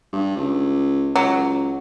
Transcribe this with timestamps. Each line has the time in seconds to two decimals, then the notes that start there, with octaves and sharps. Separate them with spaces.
0.13 G2
0.37 C#2
1.16 C#2 F#3